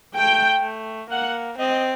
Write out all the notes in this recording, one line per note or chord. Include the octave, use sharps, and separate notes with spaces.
A3 G5
A3
A#3 F#5
C4 D#5